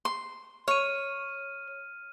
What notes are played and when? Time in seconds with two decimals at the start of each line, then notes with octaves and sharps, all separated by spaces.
0.05 C6
0.68 C#5 F6 D#7